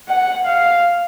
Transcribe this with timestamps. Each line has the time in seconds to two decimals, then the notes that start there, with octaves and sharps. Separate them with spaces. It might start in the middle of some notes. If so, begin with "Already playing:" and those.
0.09 F#5
0.46 F5